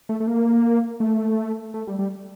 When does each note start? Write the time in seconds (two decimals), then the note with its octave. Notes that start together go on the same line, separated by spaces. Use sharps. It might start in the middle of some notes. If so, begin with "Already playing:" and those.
0.09 A3
0.20 A3
0.27 A#3
1.00 A3
1.74 A3
1.87 G3
1.99 G3